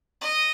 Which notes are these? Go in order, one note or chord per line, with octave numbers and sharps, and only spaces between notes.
D#5